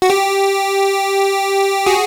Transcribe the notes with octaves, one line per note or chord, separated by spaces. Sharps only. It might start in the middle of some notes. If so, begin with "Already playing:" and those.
F#4
G4
F#4 G#4